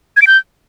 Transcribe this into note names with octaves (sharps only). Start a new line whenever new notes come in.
G#6
D7
G6